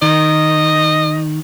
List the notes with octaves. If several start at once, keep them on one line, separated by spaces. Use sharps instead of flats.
D#3 D#5